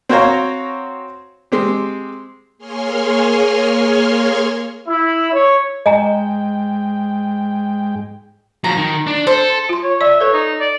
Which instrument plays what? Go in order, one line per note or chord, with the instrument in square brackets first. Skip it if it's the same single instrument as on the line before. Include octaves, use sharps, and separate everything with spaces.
[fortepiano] C4 F#4 C5 C#5 F5 A#5
G#3 C4 G4
[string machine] A#3 G#4 C#5 G#5 C6 F6
[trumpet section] E4
C#5
[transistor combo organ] G#2 G#3 G5 [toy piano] D#5 G#5 A#5
[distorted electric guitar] F3 F#3 [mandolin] A#5
[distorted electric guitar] D#3
D4
[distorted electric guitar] A4 [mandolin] C5
[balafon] F4 C6
[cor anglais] C#5
[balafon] D5 [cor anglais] E5
[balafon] A4 B4 [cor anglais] C#5
[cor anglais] D#4
D5